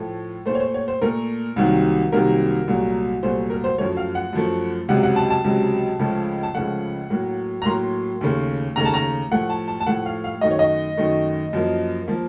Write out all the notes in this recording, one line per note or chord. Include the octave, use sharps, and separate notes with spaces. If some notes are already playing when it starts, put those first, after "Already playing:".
Already playing: A2 F3 A3
A#2 A3 C5
C#5
C5
C#5
C5
A#2 A3 A#4
C2 C3 D#3 F#3 A#3
C2 C3 D#3 F#3 A#3 A#4
C2 A#2 F#3 A3
C2 A#2 F#3 A3 C5
A#4
C5
F#2 F3 A3 C#5
F5
F#5
F#2 F3 A3
C#2 C3 F#3 F#5
F#5
A5
A5
C#2 C3 F#3
C#2 C#3 F3 A3
A5
C#2 C#3 F3 A3 F#5
A2 F#3 A#3
A#5
A2 F#3 A#3 C6
D#2 C#3 A3
D#2 C#3 A3 A#5
A5
A#5
A2 F3 A3 F#5
A5
A5
A5
A2 F3 A3 F#5
F5
F5
F#2 D#3 A3 D#5
C#5
D#5
F#2 D#3 A3
F#2 F3 A#3
F3 A#3